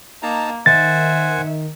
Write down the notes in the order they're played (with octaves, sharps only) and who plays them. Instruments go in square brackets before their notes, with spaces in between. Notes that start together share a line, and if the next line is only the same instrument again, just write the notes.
[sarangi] A#3 [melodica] D#4 A5 A#5
[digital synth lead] D#3 [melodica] C5 F#5 G#5 [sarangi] E5 [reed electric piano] A6